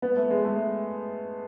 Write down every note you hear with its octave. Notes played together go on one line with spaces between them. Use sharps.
B3
A3
G#3
A3